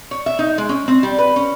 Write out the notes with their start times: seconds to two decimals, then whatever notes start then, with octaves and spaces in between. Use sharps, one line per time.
0.11 C#5
0.26 E5
0.39 D#4
0.58 G#3
0.69 C#4
0.88 C4
1.03 G3
1.18 B4
1.36 C#4